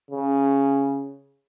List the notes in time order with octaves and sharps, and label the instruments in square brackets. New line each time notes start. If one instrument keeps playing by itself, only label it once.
[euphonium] C#3